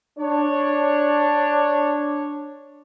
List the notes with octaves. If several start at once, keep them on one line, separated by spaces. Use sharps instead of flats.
D4 C#5